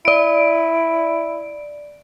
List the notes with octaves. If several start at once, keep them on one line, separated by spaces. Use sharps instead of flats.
E4 D5 D7